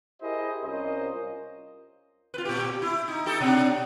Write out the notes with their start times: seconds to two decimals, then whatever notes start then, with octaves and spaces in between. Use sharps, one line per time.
0.22 E4 G4 G#4 A#4 C5 D#5
0.64 C2 C#4 F4 A#4 C5 D#5
2.34 F4 B4
2.45 A#2 G4
2.82 E4
3.08 D#4
3.26 D#4 G4 A4
3.41 B2 D4